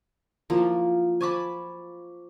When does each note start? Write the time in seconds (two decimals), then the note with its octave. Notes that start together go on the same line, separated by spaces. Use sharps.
0.50 F3 F#3 A#3 E4 F5
1.21 C5 G#5 A5 B5 C#6 D6